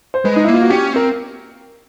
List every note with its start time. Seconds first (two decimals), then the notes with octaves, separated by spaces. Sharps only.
0.14 C5
0.25 G#3 B4
0.36 D#4
0.44 A#3 E4
0.54 F4
0.62 F#4
0.70 C#4 G4
0.93 C4 A#4